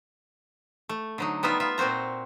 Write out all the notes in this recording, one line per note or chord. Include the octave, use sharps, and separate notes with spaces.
A3
D3 F#3 D#4
G3 B3 D#4 F4 E5
F4 E5
A#2 C4 F#4 C5 A#5